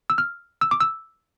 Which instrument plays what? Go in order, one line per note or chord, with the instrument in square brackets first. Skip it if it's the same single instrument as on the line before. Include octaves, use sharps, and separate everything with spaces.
[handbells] E6
F6
E6
D6
E6